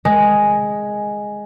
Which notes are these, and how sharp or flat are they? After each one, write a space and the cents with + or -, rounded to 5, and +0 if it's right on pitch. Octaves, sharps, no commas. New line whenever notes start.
G#3 +0